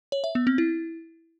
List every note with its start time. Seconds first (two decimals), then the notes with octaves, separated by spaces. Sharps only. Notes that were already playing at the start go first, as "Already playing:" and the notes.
0.12 C#5
0.24 E5
0.35 B3
0.47 C4
0.58 E4